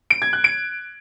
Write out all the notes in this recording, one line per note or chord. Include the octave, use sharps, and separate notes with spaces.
D7
G#6
F#6
D7